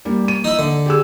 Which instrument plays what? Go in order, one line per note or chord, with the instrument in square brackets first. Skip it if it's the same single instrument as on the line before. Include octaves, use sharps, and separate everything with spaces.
[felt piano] G3 A#3
A#3 D#7
[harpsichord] D#4 E4
D3
[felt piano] G4 G#4 E6